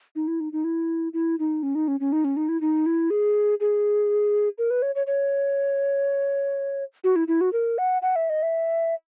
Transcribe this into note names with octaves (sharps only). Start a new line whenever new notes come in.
D#4
E4
D#4
D#4
E4
E4
D#4
C#4
D#4
C#4
C#4
D#4
C#4
D#4
E4
D#4
E4
G#4
G#4
A#4
B4
C#5
C#5
C#5
F#4
E4
E4
F#4
A#4
F#5
F#5
E5
D#5
E5